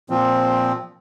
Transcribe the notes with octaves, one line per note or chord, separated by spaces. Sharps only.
A#2 F3 C4